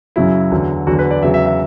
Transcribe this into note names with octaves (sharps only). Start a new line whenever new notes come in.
F#2 C#3 F#3 E4
E2 D3 F#3
E2 D3 F#3 F#4
B4
D5
E2 C#3 F#3 E5
E5
E5